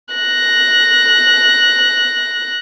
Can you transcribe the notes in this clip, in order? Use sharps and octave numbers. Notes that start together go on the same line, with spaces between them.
F#6 A#6